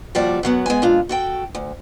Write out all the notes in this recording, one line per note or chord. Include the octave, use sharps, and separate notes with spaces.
D#2 F3 G3 F#4 D5 A5
F#2 F#3 B3
G#3 B3 G#5
A#2 G#3 D4 F4
F#4 A4 G5
D2